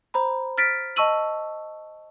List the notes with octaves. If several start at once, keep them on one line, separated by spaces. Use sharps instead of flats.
C5 A#5 B5
F6 A6 B6 D7
D#5 A5 C#6 E6 D#7 F#7